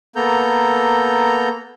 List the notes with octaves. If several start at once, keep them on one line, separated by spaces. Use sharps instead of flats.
A#3 B3 A4 A#5 G6